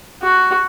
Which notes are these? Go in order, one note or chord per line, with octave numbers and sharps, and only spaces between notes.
F#4